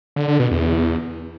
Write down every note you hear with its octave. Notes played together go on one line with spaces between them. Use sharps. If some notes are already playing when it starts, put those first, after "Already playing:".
D3
D3
B2
E2